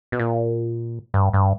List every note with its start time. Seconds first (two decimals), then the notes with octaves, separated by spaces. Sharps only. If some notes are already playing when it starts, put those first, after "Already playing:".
0.12 B2
0.19 A#2
1.14 G2
1.33 G2